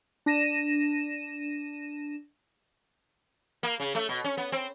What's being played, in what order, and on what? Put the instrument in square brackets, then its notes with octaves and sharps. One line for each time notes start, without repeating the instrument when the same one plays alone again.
[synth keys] D4 A#6 D#7 E7
[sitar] A#3
C#3
A3
B2
C#4
B3
C4